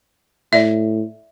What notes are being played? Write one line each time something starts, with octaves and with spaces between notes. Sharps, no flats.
A2 D5 E5